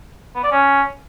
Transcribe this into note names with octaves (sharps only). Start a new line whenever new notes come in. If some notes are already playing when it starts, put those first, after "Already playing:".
B3
D5
C#4